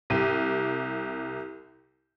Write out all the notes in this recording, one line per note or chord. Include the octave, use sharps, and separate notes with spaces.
C2 G4 D#7